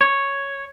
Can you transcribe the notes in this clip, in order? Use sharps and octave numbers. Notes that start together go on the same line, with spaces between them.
C#5